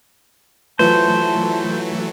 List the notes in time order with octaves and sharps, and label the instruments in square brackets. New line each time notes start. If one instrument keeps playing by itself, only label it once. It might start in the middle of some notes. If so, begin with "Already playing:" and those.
[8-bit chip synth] E3 F#3 A3 [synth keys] E4 F4 B4 [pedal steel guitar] C5 [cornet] A5